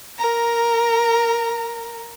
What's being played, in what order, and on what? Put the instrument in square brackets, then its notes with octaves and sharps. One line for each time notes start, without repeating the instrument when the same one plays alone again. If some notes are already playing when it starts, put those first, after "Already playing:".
[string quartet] A#4 A#5